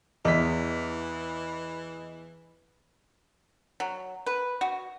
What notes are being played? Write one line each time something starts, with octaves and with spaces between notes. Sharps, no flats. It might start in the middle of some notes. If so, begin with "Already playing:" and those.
E2 E3 D#5 B6
F#3
B4
F#4